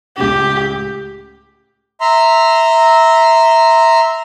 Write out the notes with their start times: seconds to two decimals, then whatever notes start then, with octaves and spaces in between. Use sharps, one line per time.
0.17 C#2 A2 C#3 G4
2.01 E5 A#5 C6